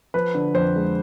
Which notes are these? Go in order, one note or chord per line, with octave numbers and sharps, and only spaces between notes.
F3 B4
D3
F2 C5
G#3